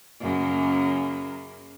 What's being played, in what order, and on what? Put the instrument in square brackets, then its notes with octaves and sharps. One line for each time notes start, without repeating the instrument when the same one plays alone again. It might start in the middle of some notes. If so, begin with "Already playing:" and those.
[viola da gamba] F#2 C#3 A#3